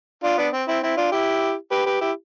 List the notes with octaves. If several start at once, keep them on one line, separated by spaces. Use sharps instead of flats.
D4 F4
B3 D4
C4
C4 E4
C4 E4
D4 F4
E4 G4
G4 B4
G4 B4
E4 G4